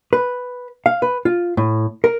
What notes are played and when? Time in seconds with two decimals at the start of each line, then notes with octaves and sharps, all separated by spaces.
0.13 B4
0.86 F5
1.02 B4
1.25 F4
1.57 A2
2.04 A#4